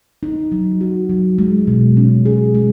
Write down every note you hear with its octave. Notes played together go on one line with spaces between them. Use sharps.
D#4
F#3
F#4
F#3
G#3
B2
C#4
G#4
G#3